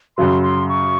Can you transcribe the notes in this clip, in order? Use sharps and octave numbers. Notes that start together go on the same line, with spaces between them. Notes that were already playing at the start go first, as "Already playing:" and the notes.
F#2 C#3 F#3 C6
C6
C#6